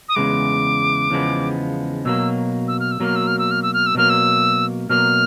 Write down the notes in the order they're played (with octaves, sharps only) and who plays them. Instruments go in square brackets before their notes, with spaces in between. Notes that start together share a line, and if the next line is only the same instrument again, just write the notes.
[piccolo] D#6
[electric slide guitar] E2 C#3 G#3 B3 [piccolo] D6
[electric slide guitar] E2 C#3 F3 G#3 B3
[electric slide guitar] B2 F#3 A#3 [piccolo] E6
[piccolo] E6
F6
E6
[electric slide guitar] B2 F#3 A#3 [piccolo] F6
[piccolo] E6
F6
E6
F6
E6
F6
E6
[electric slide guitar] B2 F#3 A#3 [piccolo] F6
[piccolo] E6
[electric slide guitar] B2 F#3 A#3 [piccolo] F6